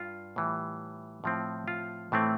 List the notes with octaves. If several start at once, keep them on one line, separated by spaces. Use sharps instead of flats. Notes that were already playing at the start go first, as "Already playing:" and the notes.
Already playing: G2 F4
A2 E3 G3
A2 F3 C4
F4
A2 E3 A3 C4